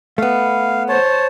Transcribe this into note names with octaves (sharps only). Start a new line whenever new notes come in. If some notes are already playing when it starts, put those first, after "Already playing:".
A3 B3 F5
C5 C#5 A5